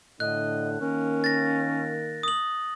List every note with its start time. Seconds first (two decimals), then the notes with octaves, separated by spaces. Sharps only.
0.20 A2 D3 D#5 F#6
0.81 D#3 A#3 C#4 A#4
1.24 A6 A#6
2.23 D#6 F#7